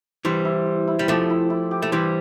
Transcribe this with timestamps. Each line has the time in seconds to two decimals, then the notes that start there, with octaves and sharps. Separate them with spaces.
0.25 E3 G3 C5
0.45 E4
0.66 E4
0.88 E4
0.99 G3
1.08 F3 A3 G4
1.30 E4
1.50 E4
1.71 G4
1.82 A3
1.92 E3 G3 C5